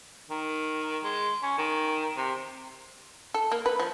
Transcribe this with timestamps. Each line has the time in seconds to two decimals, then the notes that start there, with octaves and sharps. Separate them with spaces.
0.30 D#3
1.03 G#3
1.43 C#4
1.58 D#3
2.17 C3
3.34 A4
3.52 A#3
3.66 B4
3.80 F3